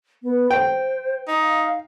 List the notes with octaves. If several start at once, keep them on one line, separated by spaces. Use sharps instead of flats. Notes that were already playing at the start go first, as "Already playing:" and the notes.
B3
C5 G5
D#4
F5